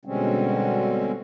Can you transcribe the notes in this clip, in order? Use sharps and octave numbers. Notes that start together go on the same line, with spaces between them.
B2 D3 G3 G#3 C4 C#4